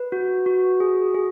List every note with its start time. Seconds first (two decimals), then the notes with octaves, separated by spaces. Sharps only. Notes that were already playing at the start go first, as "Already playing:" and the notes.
Already playing: B4
0.12 F#4
0.46 F#4
0.80 G#4
1.15 G#4